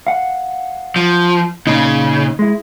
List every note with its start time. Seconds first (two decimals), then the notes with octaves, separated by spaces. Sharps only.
0.07 F5 F#5
0.96 F3
1.67 A#2 C#3 D#4
2.39 G#3 E4